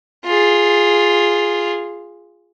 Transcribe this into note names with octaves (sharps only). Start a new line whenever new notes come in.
F4 G#4